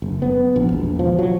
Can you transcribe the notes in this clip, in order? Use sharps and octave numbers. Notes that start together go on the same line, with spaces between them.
F#1
B3
A#1
E1
F3
F#3